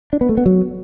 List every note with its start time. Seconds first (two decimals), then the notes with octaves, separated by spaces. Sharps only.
0.13 D4
0.21 B3
0.29 A3
0.37 B3
0.46 F#3